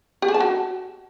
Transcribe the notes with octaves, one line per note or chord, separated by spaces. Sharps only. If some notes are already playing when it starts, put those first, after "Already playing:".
G4
G#4
A5
F#4